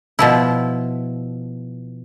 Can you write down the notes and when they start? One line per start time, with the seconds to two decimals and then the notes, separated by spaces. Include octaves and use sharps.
0.19 B2 F3 E4